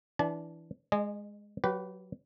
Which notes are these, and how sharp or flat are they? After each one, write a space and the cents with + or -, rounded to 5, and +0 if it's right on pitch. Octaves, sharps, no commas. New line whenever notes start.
E3 +0 D4 -10 A5 -40
G#3 +0 D#5 -30 G#5 +0
F#3 +0 G4 -30 B4 +0